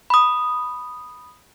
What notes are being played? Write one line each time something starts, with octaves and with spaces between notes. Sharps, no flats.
B5 D#6